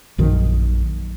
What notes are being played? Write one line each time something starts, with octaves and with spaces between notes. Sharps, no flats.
A#1 F#2 D#3